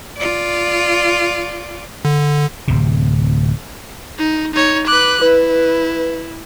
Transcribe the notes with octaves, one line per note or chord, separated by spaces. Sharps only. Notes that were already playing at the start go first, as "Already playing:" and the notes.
F4 D5
D3
D1 C3
D#4
D#4 C#5
B4 D6 F#6
E4 B4